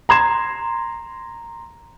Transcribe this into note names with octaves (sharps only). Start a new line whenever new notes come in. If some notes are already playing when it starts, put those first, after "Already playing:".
A#5 C6 G#6 E7